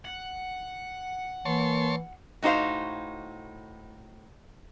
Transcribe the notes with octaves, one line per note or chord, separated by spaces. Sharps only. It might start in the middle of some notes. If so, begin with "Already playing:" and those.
F#5
E3 A#3 C#5 A5 C6
A2 D#4 F#4 C5 F5